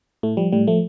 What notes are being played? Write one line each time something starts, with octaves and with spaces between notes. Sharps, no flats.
A2 A3
F3 G3
A2 G3
F3 A3